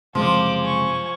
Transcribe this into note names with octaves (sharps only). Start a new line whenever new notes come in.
F#1 C3 F3 G#3 C6 D6
G#5 C#6